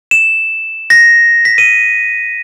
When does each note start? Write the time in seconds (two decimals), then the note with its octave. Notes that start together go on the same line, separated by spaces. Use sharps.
0.11 E7
0.90 A#6
1.45 B6
1.58 D#7